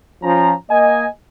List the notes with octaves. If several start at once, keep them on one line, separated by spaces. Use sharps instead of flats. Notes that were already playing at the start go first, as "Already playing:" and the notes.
F3 C#4 A#5
A#3 D#5 G#5